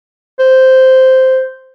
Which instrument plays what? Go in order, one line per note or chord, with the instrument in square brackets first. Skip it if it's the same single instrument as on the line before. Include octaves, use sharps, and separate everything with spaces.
[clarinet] C5